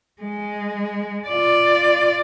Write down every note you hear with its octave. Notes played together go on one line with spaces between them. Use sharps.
G#3
F4 D5